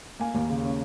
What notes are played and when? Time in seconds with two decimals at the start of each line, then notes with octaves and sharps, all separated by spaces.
0.20 A#3 G#5
0.34 D#2
0.50 C#3
0.65 C#4